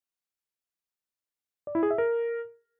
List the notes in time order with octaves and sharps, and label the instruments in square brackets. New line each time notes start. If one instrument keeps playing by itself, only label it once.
[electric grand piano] D5
E4
G#4
E5
A#4